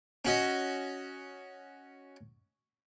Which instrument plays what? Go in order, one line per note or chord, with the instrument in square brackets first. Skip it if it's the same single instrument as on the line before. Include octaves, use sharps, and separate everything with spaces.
[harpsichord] C#4 F#4 D#5